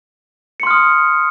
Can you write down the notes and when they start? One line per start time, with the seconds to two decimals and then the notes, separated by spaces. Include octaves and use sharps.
0.60 C#7
0.63 C6
0.67 F6
0.71 D#6